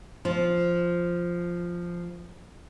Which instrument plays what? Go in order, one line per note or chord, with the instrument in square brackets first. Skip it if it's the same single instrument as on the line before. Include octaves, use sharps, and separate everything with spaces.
[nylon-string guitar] F3 F4